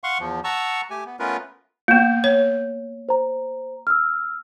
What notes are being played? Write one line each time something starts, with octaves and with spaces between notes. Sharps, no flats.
F5 F#5 C6 C#6
E2 F3
F#5 A5 A#5 C#6 E6
A3 G4 G#5
B3
A3 B3 C#4 F4 A#4 B4
A#3 B3 G6
C#5
C5 A#5
E6 F6